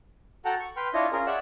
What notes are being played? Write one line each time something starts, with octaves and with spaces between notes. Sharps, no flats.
F#4 A4 F#5 G5 A5 A#5
C#6
B4 G5 C6 F6
D4 E4 F4 C#5 D#5
C#4 F4 G#4 A#4
G#4 C#5 D5 E5 F#5 E6